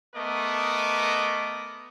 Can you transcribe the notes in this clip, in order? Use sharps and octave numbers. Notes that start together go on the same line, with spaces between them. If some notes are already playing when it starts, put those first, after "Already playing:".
A3 B3 A#4 D#5 D6